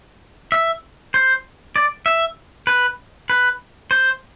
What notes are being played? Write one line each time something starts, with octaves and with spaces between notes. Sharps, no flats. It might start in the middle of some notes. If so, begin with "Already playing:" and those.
E5
C5
D5
E5
B4
B4
C5